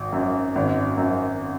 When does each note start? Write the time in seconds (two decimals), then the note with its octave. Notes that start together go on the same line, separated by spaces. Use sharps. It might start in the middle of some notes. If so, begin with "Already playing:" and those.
Already playing: G#1
0.12 F#2
0.56 G#1
0.98 F#2